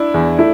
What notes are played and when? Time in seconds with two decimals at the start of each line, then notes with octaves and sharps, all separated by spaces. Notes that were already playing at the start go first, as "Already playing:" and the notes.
Already playing: D4 E4
0.14 E2
0.39 A3 E4